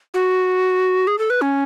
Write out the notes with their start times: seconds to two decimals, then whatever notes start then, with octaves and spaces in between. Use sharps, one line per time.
0.14 F#4
1.07 G#4
1.19 A4
1.30 B4
1.42 C#4